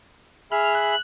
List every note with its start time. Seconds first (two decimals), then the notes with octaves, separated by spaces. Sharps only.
0.52 G#4 E5 B5 F6
0.75 F#6